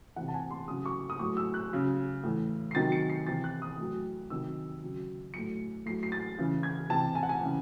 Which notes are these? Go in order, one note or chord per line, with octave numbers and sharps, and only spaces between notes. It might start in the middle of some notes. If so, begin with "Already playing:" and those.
C3 E3 F#5
A5
G#5
C6
C#3 F#3 D#6
C#6
D#6
A2 F#3 C#6
E6
F#6
C#3 F#3
A2 E3
C7
C3 D#3 F#3 A6
C#7
C7
C3 E3 A6
F#6
D#6
A2 F#3
C3 D#3 F#3 E6
C#3 F#3
A2 F#3 C#7
A2 F#3 C7
C7
A6
C#3 E3
G#6
C3 E3 A5
G#5
F#5
G#5
C#3 E3